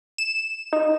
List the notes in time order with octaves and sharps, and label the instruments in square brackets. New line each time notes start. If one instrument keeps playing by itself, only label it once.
[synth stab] E7
D#4